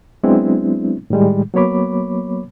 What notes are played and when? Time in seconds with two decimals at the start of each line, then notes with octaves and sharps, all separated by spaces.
0.23 F#3 G#3 B3 C4 D4 E4
1.10 A2 D#3 G3 G#3
1.54 F#3 A#3 B3 C#5 B5 D6